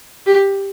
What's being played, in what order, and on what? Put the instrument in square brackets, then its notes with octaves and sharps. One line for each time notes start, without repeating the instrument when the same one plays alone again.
[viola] G4